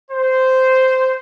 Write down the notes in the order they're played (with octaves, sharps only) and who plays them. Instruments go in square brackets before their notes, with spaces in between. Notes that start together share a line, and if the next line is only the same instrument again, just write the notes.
[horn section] C5